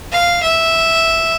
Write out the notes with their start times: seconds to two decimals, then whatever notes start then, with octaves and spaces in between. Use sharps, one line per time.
0.12 F5
0.42 E5